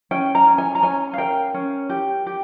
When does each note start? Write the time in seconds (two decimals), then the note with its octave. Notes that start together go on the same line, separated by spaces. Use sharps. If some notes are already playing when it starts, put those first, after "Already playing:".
0.11 C#4 G5
0.35 A#5
0.47 C#4
0.58 G#5
0.75 A#5
0.83 C#4 G#5
1.14 F5
1.18 A#4 G5
1.54 C#4
1.89 G4
2.26 G4